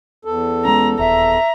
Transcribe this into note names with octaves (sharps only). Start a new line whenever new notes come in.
E2 A4
G#3 B3 C#4 A#5
D#1 E5 A#5